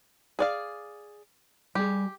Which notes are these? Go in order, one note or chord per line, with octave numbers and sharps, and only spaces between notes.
G#4 D5 F5
G3 G4 G#4